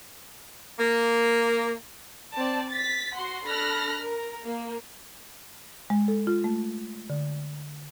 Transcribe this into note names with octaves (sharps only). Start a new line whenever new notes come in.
A#3
C4 D5 A5
A6 B6
F#4 F#5 C6
D4 A4 B5 F6 F#6 A#6
A#4
A#3
G#3
A4
F4
A3
D3